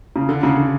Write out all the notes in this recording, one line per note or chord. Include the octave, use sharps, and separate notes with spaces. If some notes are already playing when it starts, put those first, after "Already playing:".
C#3
D3
C#3
D3